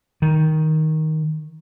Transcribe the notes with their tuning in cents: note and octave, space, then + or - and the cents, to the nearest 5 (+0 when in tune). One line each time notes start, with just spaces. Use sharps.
D#3 +10